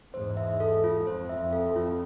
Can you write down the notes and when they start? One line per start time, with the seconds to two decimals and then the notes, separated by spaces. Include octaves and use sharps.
0.14 E2 G#2 C5
0.37 E5
0.60 A4
0.84 F4
1.06 F2 C5
1.29 E5
1.38 F2
1.53 A4
1.68 F2
1.76 F4